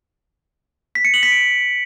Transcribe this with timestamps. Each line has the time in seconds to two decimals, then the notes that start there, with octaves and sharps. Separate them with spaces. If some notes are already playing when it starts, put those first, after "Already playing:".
0.95 B6
1.05 C#7
1.14 F#7
1.23 B6
1.32 D7